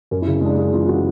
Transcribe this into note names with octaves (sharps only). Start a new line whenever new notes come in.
F#2 A#4
E4
C#3
G#3 D4
G#3
E3 F4
E3 F#4